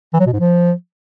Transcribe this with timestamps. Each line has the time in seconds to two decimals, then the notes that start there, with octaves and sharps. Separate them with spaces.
0.13 E3
0.20 F#3
0.26 B2
0.33 G#2
0.39 F3